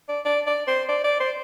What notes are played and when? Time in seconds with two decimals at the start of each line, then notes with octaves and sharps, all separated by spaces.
0.09 D5
0.25 D5
0.47 D5
0.67 C5
0.89 D5
1.04 D5
1.20 C5